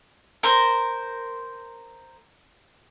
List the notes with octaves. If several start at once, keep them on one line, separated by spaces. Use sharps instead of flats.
A#4 C5